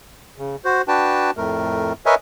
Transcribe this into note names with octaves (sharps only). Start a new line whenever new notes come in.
C#3
F#4 C5
D4 F#4 B4 G5 A5
F2 A2 A3 A#4
A#4 B4 C#5 D#5 E5 G#5